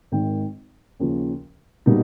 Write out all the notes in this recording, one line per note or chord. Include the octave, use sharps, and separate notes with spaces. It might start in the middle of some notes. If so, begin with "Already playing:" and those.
G#1 G#2 D#3 G5
D#2 C#3 F3
B2 G3 A#3 D#4